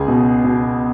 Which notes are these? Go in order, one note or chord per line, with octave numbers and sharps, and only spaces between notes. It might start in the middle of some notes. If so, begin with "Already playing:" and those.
Already playing: C#2 G#4
B2
B2